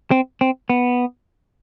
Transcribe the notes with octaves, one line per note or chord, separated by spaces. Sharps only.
C4
C4
B3